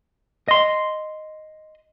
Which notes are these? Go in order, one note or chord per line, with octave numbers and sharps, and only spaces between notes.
D#5 C6